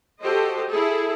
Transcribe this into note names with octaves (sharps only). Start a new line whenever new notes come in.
F#4 G4 A4 C5 D#5
E4 G#4 A4